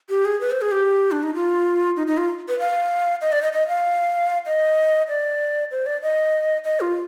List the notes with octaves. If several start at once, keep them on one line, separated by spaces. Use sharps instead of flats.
G4
G#4
B4
C5
G#4
G4
D4
D#4
F4
D#4
D#4
F4
B4
F5
D#5
D5
D#5
D#5
F5
D#5
D5
C5
D5
D#5
D#5
F4